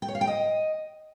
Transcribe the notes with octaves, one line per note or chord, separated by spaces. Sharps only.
G5
C#5
F5
G5
D#5